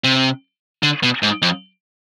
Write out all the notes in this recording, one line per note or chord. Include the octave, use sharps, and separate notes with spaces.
C3
D3
B2
G#2
F2